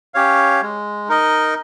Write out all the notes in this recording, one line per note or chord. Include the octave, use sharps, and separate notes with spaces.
C#4 G4 C#5 F5
G#3
D#4 A#4 D#5